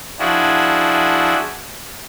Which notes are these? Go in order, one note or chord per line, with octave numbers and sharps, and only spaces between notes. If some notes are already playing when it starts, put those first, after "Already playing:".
F3 D4 E4 F#4 G#4